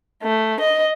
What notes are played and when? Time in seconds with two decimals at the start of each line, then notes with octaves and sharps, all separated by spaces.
0.22 A3
0.61 D#5